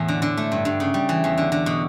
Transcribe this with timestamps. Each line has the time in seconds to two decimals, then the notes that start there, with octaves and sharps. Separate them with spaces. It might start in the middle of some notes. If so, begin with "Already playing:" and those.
Already playing: E2 A2 A3
0.08 D3
0.22 D3
0.37 A3
0.52 G2
0.65 G2
0.80 C#3
0.94 G3
1.09 E3
1.24 E2
1.38 D3
1.52 D3
1.66 B2